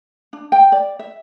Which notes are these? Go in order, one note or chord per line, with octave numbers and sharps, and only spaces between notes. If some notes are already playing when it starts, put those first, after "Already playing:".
D4
G5
D5
E5